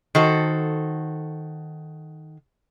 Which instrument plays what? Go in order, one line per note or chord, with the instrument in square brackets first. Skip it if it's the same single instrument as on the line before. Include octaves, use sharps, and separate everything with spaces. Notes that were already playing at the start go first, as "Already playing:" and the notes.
[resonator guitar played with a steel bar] D#3 F#4 A4 C5